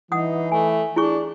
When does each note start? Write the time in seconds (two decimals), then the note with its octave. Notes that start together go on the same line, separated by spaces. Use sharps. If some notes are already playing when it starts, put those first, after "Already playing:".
0.12 E3 D#4 F#5 D#6
0.52 A3 G#5
0.96 D4 E4 G#4 C#6